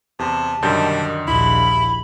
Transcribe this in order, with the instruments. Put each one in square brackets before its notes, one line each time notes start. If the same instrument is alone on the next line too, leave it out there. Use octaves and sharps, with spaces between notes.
[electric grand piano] E2 [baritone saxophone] C3 [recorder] A5
[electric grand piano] F#2 D3 G6 [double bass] D#3 [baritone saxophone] G3
[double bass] A#1 D#2 [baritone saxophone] E4 [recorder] B5